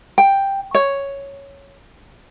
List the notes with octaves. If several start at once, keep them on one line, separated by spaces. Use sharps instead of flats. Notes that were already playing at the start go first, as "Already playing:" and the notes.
G5
C#5